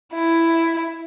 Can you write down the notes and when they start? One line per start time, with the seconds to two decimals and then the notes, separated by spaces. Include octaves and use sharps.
0.14 E4